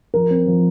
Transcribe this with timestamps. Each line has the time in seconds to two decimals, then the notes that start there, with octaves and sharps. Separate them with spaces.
0.14 F3 A#4
0.30 C4
0.46 F3